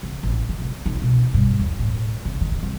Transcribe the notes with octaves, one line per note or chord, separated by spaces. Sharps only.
C#3
A1
D#3
C3
D#4
B2
G2
D#2
A2
C#3
D#3
C2